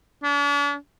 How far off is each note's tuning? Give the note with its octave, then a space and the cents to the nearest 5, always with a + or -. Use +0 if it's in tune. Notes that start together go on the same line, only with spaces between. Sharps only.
D4 -45